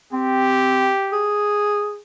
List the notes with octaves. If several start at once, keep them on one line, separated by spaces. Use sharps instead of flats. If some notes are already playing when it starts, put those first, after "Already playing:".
C4 G4
G#4